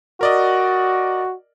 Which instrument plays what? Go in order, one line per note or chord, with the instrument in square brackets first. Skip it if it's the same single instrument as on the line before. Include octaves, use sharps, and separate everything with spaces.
[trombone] F#4 [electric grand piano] A#4 D5 D#5